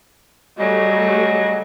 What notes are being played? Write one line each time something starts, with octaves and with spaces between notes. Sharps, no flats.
C#3 F#3 G3 A3 D#5